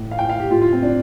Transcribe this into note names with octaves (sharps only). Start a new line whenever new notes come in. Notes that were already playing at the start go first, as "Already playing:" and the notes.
Already playing: A2
F5
G5
F5
G4
A2 F4
F4
C4
D4